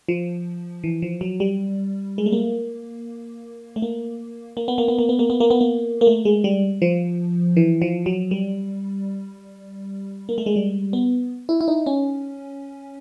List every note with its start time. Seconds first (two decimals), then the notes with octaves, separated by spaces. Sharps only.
0.09 F3
0.84 E3
1.02 F3
1.21 F#3
1.40 G3
2.18 G#3
2.26 A3
2.32 A#3
3.76 A3
3.82 A#3
4.57 A#3
4.68 B3
4.78 A#3
4.88 B3
4.99 A#3
5.09 B3
5.19 A#3
5.30 B3
5.40 A#3
5.50 B3
5.61 A#3
6.01 A#3
6.07 A3
6.25 G#3
6.44 G3
6.82 F3
7.57 E3
7.82 F3
8.06 F#3
8.31 G3
10.29 A#3
10.38 A3
10.46 G#3
10.56 G3
10.93 B3
11.49 E4
11.61 E4
11.68 D#4
11.86 C#4